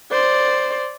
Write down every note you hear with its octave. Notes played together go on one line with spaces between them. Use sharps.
C5 D5